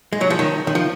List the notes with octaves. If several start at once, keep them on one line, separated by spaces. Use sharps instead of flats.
G#3
F#3
F3
D#3
D#3
F3